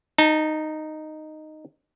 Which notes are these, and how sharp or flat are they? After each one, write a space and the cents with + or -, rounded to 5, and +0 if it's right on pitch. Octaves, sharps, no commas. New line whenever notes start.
D#4 -5 A5 +35